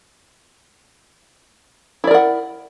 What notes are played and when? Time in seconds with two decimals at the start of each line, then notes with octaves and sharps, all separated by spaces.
2.04 E4
2.07 D5
2.11 A#4
2.14 F#5